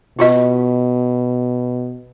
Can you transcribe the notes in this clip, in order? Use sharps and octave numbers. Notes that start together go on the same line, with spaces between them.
B2 F4 F#4 D#5